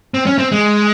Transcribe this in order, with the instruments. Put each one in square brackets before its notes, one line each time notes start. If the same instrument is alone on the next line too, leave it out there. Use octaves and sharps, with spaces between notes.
[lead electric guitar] C4
C#4
C4
G#3